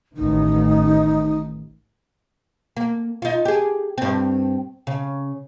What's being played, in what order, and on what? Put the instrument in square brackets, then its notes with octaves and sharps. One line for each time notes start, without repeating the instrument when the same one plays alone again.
[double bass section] A1 D#3 [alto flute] D#4
[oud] A#3
D#4 F4
G4 G#4
G2 C4
C#3